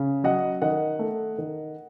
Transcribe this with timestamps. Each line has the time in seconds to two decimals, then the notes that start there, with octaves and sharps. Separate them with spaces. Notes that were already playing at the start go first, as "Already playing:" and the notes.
Already playing: C#3
0.24 F#3 D#5 F#5
0.62 D#3 D#5 F#5
0.99 A3
1.38 D#3